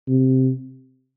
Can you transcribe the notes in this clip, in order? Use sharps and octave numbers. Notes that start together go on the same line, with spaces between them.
C3